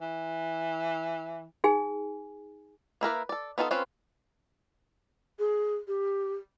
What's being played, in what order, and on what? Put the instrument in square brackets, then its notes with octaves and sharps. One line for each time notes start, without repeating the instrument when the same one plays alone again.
[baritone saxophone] E3
[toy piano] D#4 G#4 G#5
[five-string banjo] A#3 E4 A#4 B4
A4 D5
B3 D#4 F4 G#4 A4
C4 C#4 F4 B4 C5
[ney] G#4
G4